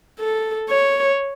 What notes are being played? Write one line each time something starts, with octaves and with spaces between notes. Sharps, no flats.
A4
C#5